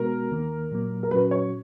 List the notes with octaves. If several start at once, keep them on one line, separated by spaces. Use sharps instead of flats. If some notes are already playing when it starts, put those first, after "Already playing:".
Already playing: B2 G#3 B3 F#4 A#4
D#2 D#3 A#3
A#2 F#3 A#3
A#4
A#2 F#3 C#4 F#4 B4
B4
C#5